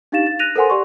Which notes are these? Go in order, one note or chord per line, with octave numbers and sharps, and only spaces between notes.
D4 D#4 G4 F5 A6 E7
A6
F#6 A#6 D#7 F7
A4 A#4 C5 F#5 G#5 C6
G4 D5 C6 C#6